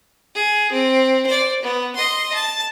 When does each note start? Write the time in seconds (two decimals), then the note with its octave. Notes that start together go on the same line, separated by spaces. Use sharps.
0.35 G#4
0.72 C4
1.27 C5 D5
1.62 B3
1.96 D#5 C6
2.34 A5